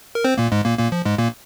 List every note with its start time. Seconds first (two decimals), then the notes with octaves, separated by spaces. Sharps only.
0.15 A#4
0.24 C4 C5
0.38 A#2 A#3
0.52 G#2 G#3
0.65 A#2 A#3
0.79 A#2 A#3
0.92 F3
1.05 G#2 G#3
1.18 A#2 A#3